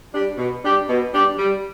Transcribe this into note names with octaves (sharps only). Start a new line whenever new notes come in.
G3 D4 G4
B2
G3 D4 G4
B2
G3 D4 G4
G3